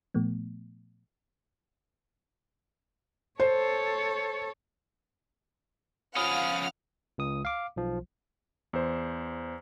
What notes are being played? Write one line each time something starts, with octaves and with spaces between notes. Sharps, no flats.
A#2 F3 A3 B3
A4 C5 C#5
F3 C#4 F5 F#5 B5 D#6 F6
C#2 D#6
F5 D6
B1 F3
E2 C5